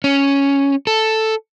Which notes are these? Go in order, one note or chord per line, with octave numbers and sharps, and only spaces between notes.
C#4
A4